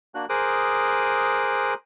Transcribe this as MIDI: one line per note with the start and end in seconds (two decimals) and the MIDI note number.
0.15 0.26 58
0.15 0.26 62
0.15 0.26 66
0.15 0.26 90
0.29 1.74 68
0.29 1.74 70
0.29 1.74 72
0.29 1.74 86
0.29 1.74 87
0.29 1.74 90